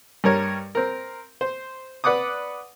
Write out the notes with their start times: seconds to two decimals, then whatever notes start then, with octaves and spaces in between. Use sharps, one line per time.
0.24 G2 A#4 C#5
0.75 C4 A#4
1.41 C5
2.04 B4 D5 F#5 D6 D#6